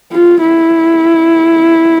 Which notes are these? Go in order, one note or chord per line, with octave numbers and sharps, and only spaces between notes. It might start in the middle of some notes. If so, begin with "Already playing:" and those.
F4
E4